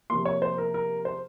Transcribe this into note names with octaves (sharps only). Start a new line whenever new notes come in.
C3 F3 A#3 C6
C#5
C5
A#4
A#4
C5